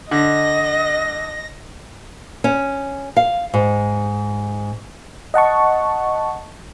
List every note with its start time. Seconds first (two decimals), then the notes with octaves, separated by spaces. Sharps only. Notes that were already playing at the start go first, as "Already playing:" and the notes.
0.11 D3 D#5 A#6
2.44 C#4
3.17 F5
3.54 G#2
5.34 D#5 F#5 A5 C#6